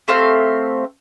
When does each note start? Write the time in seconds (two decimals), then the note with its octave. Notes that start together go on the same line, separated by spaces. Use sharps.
0.08 A3 C4 G4 F5